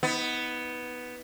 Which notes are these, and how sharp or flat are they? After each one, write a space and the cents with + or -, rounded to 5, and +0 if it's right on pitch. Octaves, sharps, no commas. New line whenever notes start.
B3 +0 D#4 +35